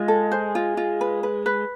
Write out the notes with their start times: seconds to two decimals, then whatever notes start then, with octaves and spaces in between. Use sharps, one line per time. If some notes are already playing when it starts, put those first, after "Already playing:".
Already playing: G#3 F4
0.08 A4
0.32 C5
0.55 F4
0.77 F4
1.01 B4
1.23 B4
1.46 B4